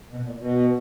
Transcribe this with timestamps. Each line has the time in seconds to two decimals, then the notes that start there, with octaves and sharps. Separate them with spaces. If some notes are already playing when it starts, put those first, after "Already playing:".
0.11 B2
0.26 A#2
0.40 B2